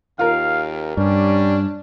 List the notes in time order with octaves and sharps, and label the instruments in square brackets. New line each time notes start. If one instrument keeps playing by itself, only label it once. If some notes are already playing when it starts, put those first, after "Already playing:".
[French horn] D#2 [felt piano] F4 A#4 [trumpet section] F5
[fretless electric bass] G2 [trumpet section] G3 C#4 [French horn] D4